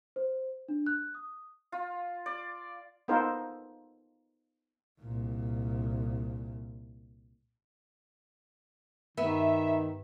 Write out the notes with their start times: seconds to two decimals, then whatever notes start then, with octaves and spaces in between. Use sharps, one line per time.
0.16 C5
0.68 D4
0.87 F#6
1.15 D#6
1.72 F4
2.26 D5
3.08 B3 D#4 F4 A4 A#4 C5
5.00 C2 A#2
9.17 G2 D#3 B3 E5